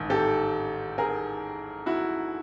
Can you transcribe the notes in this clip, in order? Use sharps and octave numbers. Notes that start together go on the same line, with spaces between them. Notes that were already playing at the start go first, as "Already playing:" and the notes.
Already playing: A1 G#2 D#3
G4 A4
G#4 A#4
E4 F#4